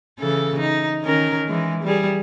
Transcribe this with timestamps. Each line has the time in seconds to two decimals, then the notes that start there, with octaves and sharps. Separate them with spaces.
0.20 C#3 E3 A4
0.59 D#4
1.04 D#3 C#4 A#4
1.48 E3 G#3
1.84 G3 G#4